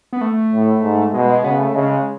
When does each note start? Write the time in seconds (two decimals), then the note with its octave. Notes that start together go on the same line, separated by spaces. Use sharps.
0.13 B3
0.21 A3
0.52 A2
0.83 G#2
1.13 B2 G#3
1.29 G#3
1.44 C#3 B3
1.59 A3
1.75 C#3 G#3
1.90 G#3